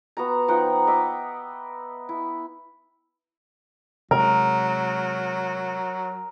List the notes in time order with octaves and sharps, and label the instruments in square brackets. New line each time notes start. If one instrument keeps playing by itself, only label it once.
[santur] B3 F#4 A#5
F3 D#4 F#5 G5
D#5 E5 D6
E4
[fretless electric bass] C3 G#3 [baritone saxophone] F#3 [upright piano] A#4